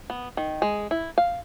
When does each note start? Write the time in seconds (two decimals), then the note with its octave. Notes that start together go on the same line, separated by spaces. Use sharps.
0.10 B3
0.37 D#3
0.62 G#3
0.91 E4
1.18 F5